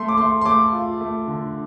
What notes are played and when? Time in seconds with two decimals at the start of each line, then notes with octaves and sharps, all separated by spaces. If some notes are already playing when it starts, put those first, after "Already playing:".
Already playing: A3 C6
0.08 D6
0.17 A3 C6
0.41 C6
0.45 A3 D6
0.72 F4
1.01 A3
1.27 D3